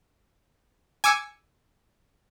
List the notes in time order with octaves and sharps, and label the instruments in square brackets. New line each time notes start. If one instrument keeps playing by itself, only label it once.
[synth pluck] G#5 D6 E6 C#7